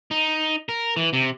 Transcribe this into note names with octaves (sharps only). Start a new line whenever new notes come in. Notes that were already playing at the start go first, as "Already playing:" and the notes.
D#4
A#4
E3
C3